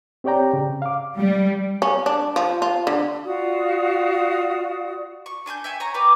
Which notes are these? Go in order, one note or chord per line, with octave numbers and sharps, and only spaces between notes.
C4 G4 C#5 D5 G5 A#5
C#3
F5 D6
G3
C#4
D4
F3
F4
D3
F4 F#4 D5 D#6
C#6
D4 G#5 C6 G6
E5 G5 G#5 C#6
C#5 G#5 A#5 C#6
G4 B4 D5 A#5